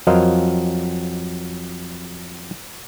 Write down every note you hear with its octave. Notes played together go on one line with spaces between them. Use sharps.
F2 F#3 A#4 C5 D#5 F5